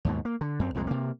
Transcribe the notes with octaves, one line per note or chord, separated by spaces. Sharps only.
D#2 G#2 B2
A#3
D3
F#2 C4
C2 F2 A#2 G#3
C3 A#3